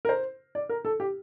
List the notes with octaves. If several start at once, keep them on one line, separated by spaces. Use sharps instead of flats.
A#4
C5
D5
A#4
A4
G4